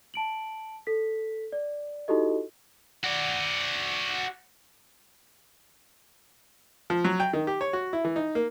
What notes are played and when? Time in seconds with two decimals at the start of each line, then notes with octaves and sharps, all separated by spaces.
0.14 A5 D7 F#7
0.87 A4 B6
1.52 D5
2.08 D#4 E4 F#4 G4 A4 D#5
3.04 F#4 D5
6.90 F3
7.04 F#3
7.20 G5
7.33 D#3
7.47 G4
7.61 C#5
7.73 F#4
7.93 E4
8.04 E3
8.16 D#4
8.35 A#3